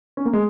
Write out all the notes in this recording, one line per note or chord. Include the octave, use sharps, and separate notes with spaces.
C#4
A#3
G#3